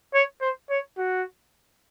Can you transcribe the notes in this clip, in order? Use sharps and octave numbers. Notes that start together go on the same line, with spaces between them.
C#5
C5
C#5
F#4